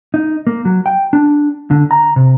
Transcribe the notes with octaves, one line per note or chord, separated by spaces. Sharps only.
D#4
A#3
F#3
G5
D4
D3
A#5
C3